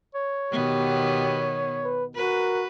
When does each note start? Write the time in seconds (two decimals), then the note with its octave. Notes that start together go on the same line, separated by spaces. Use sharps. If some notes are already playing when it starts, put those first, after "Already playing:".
0.15 C#5
0.51 B2 D#3 B3 G4
1.84 B4
2.16 F#4 A#4 B4